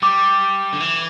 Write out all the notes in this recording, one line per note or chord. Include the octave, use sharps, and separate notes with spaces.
G3 D6
D3
E3